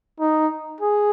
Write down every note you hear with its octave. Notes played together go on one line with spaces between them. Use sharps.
D#4
G#4